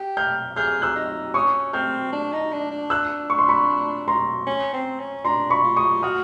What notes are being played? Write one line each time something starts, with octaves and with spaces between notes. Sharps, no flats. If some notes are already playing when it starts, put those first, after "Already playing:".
Already playing: G4
F6 G6
G#4 F6 G6
E6 F#6
D#4
C#4 C#6 D#6
C4 F6 G6
D4
D#4
D4
D4
E6 F#6
C#6
C6
B5 C#6
A#5 C6
C#4
C4
C#4
D4 A#5 C6
B5 C#6
F4
C#6 D#6
F#4 D#6 F6